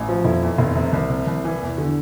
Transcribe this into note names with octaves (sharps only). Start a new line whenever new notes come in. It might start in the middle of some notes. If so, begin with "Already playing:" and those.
Already playing: A1
F3
F1 E4
E2
F1
C3
C2
C3
C2
E3
E2
D3